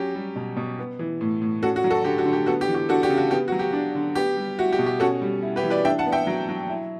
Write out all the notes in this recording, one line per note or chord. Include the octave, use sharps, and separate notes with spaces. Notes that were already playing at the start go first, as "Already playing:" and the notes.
Already playing: F#3 C#4 G4
G3
B2
B2
B3
E3
A2
A2
C#4 F#4 A4
F#4
F#3
F#4 A4
D3 G4
F#4
D3
G4
B3 F#4 A4
G4
E3
G4
D4 F#4 A4
G4
C#3
F#4
B3 G4
F#3 F#4
G4
D4
D3
B3 G4
G3
E4 F#4
G4
B2
G4
C#4 F#4 A4
G3
E4
G4 B4
E3
B4 D5
D4 E5 G5
F#5 A5
B3
E5 G5
F#3
F#3
E4